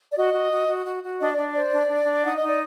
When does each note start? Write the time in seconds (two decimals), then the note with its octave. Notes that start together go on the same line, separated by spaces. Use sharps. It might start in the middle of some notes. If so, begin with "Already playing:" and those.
0.11 D5
0.16 F#4 D#5
0.34 F#4
0.51 F#4
0.68 F#4
0.85 F#4
1.03 F#4
1.20 D4 D#5
1.32 D5
1.37 D4
1.53 C5 D5
1.72 D4
1.89 D4
2.06 D4
2.23 D#4 F#5
2.35 D#5
2.41 D#4
2.47 D5